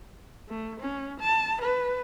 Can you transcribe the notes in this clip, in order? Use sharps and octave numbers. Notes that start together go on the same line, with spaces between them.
A3
C#4
A5
B4